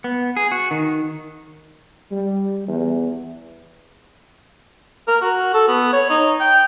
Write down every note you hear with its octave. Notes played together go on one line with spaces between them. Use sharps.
B3
G#4
F#4
D#3
G3
E2
A#4
F#4
A4
B3
C#5
D#4
G5